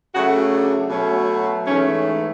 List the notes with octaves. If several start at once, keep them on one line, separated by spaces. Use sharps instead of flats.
C#3 F#3 A3 F#4
D4
B2 F#3 A3 C#4
G#2 E3 A3 C#4